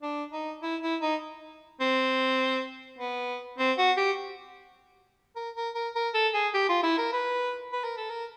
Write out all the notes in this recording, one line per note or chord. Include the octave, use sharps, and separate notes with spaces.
D4
D#4
E4
E4
D#4
C4
B3
C4
F#4
G4
A#4
A#4
A#4
A#4
A4
G#4
G4
F4
E4
A#4
B4
B4
A#4
A4
A#4